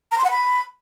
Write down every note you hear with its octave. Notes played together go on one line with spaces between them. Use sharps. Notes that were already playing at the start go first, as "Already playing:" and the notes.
A#5
C6
F#5
B5